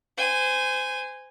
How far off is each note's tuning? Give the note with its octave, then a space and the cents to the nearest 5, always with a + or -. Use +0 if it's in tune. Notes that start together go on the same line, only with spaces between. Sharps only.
C5 -30 G#5 -10